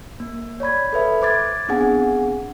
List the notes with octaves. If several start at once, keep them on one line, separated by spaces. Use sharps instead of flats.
A#3
C#5 D5 B5 G#6
A4 B4 E5 B5
C5 D6 G#6 A6
B3 C4 D4 G#4 F#5 G#5